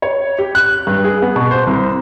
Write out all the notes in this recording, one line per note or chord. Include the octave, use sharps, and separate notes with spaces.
C#5
G4
F#6
G2
G#4
B3
B2
C5
C2